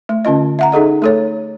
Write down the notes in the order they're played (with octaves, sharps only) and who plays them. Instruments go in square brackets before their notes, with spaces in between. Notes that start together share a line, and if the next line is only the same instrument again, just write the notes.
[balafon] A3
D3 C#4 F4 D#5
E5 F#5 A#5
D#4 G#4 A4 D#5
A3 A4 C#5